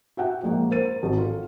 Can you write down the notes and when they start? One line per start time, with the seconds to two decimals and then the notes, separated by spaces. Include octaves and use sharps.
0.17 F#4 E5 F#5 G5
0.44 A#1 G#3 A#3
0.71 A#4 C5 A6 D#7
1.03 G#1
1.17 F4 A4